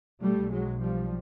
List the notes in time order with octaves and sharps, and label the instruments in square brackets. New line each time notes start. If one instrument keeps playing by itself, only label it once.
[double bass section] B1 B2 G3 A3
F#3 G#3
F3 G3